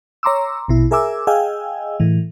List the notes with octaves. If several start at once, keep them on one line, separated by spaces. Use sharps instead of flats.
C#5 A#5 C6 D6 E6
A#1 B2 E4
G#4 A#4 E5 G#5 D6 E6
G#4 D#5 F5 G5 G#5 E6
A2 E3